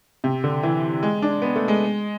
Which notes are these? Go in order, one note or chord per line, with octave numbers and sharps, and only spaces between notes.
C3
D3
E3
G#3
D4
B3
A3
G#3